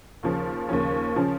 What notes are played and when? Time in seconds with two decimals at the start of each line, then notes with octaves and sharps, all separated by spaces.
0.23 D#2 C#3 F3 C#4
0.69 D#2 C#3 F3 C#4
1.16 C#3 F3 C#4